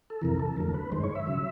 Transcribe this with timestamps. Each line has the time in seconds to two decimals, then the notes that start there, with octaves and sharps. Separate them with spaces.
0.10 A4
0.21 F2 C3 E3 A#4
0.39 A4
0.56 F2 D3 F#3 A3 A#4
0.74 B4
0.91 G2 D#3 G#3 C5
1.03 C#5
1.15 E5
1.27 C#3 F#3